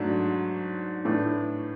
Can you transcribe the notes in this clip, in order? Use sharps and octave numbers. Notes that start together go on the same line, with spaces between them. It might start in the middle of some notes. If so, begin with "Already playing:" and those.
Already playing: G#2 F#3 A3 D4
A2 E3 A3 D4